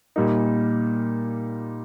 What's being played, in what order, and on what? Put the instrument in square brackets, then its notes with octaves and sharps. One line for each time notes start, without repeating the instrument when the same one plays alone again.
[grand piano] A#2 G3 A#3 D#4